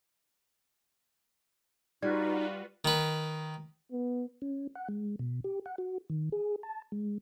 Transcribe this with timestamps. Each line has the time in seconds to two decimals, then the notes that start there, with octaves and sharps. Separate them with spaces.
2.02 G3 D#4 F4 F#4 B4 D5
2.85 D#3 B4
3.92 B3
4.42 C#4
4.75 F#5
4.89 G#3
5.19 B2
5.44 G4
5.66 F#5
5.78 F#4
6.10 D#3
6.32 G#4
6.63 A5
6.92 G#3